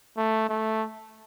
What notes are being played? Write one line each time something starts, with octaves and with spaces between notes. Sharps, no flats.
A3
A3